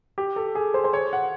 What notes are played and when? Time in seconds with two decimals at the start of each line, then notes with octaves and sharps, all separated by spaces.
0.18 G4
0.36 A4
0.55 G#4
0.74 C5
0.84 C5
0.93 C#5
1.13 F#5